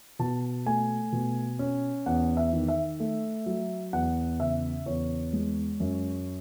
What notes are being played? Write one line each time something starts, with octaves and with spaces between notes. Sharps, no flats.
B2 A5
A3 G#5
B2
C#4
E2 F#5
E5
D#3
E5
A3
F#3
E2 F#5
C#3 E5
E2 C#5
G#3
F#2